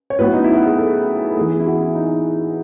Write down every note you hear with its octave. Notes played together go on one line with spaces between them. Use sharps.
C#5
A2 F#3 B3 B4
D#4
E4
F#4
G#4
A4
A4
E3 B3 G#4
E4
F#4
E4
D#4